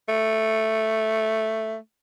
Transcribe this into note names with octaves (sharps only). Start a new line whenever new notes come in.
A3